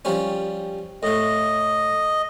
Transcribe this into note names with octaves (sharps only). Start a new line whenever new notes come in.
F3 G3 C#4
A2 A3 D#5